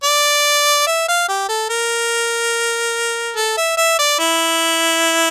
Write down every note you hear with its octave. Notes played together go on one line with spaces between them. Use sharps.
D5
E5
F5
G4
A4
A#4
A4
E5
E5
D5
E4